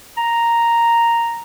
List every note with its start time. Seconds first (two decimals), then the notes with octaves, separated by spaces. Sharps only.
0.17 A#5